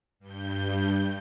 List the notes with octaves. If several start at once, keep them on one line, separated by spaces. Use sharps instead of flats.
G2 G6